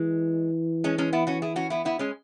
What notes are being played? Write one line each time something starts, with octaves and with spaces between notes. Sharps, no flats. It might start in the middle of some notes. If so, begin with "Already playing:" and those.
Already playing: E3 G#3
G#3 C#4
G#3 C#4
B3 E4
C#4 F#4
E4 G#4
C#4 F#4
B3 E4
B3 E4
G#3 C#4